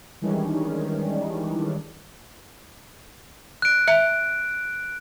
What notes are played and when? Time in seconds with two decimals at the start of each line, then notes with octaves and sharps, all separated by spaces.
0.21 D#3 E3 G3 G#3 C#4 D4
3.62 F#6 D7
3.88 E5